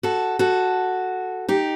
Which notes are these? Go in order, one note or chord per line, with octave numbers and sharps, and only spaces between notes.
F#4 A4
F#4 A4
D#4 G4